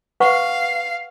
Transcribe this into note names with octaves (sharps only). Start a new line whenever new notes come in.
B4 F5 F#5 C#6